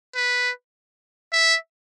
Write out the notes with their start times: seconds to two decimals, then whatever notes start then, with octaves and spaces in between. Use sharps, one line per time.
0.16 B4
1.33 E5